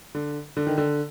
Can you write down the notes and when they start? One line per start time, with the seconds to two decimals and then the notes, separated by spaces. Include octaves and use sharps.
0.15 D3
0.57 D3
0.67 D#3
0.78 D3